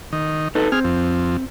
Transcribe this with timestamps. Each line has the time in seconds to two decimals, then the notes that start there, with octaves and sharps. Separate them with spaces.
0.13 D#3
0.55 D#4 A4 B4
0.72 C4 G#4 F6
0.84 F2